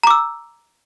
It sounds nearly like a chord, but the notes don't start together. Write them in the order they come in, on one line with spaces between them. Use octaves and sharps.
A#5 D6 E6